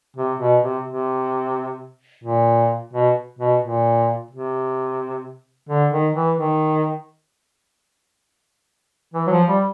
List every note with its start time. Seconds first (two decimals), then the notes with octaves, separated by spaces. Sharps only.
0.17 C3
0.40 B2
0.63 C3
0.86 C3
2.24 A#2
2.93 B2
3.39 B2
3.62 A#2
4.31 C3
5.69 D3
5.91 D#3
6.15 E3
6.38 D#3
9.14 E3
9.27 F#3
9.31 F3
9.48 G3